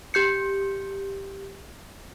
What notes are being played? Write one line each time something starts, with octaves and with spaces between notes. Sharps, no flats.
G4 G6 C#7